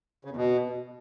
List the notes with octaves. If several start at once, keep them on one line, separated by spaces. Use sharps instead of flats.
C#3
E2
B2